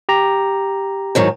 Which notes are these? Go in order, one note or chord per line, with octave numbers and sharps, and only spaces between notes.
G4 A#5
G#2 D#3 F#3